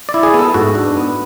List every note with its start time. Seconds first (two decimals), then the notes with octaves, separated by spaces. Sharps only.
0.09 D5
0.14 E4
0.23 G#4
0.34 B3
0.39 A4
0.54 G#2 F#4
0.75 D4
0.97 B3